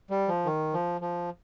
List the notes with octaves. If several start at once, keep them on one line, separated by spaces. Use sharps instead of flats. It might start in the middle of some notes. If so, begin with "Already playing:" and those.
G3
F3
D#3
F3
F3